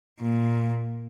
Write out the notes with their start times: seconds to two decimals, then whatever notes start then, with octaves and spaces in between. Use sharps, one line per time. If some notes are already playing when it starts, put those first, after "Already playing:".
0.21 A#2